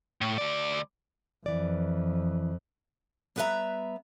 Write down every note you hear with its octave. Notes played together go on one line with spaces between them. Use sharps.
A2
D2 D5
F2 E3 D5
G3 B3 B4 C#5 E5 A#5